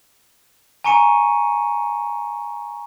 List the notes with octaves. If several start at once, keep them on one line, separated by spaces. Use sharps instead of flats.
G#5 A#5 C#6 C#7 D#7